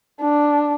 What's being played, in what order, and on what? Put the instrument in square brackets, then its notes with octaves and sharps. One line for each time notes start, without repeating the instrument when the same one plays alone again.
[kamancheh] D4